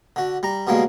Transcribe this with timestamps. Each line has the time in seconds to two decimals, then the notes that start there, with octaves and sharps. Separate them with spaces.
0.16 D3 F#4
0.43 G3 A#5
0.67 B2 D3 G3 G#3 A#3